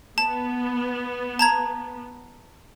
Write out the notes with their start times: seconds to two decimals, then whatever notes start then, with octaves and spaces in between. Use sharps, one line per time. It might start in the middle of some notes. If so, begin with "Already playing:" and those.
0.18 B3 A5
1.39 A5 A#5 G#6